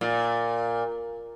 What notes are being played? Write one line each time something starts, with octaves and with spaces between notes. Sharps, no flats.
A#2